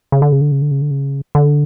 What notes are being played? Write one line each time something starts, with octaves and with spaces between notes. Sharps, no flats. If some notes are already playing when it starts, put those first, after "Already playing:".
C#3
D3
C#3
D3
C#3
D3
C#3
D3
C#3
D3